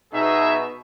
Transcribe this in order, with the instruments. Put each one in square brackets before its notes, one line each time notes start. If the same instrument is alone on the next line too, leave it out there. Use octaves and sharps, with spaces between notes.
[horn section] B2 [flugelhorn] D#4 [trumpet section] G#4 E5